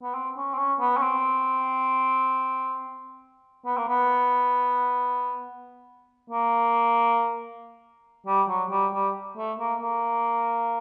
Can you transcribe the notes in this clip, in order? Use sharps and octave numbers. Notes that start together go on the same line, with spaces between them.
B3
C4
C#4
C4
C#4
B3
C#4
C4
B3
A#3
B3
A#3
G3
F#3
G3
G3
A3
A#3
A#3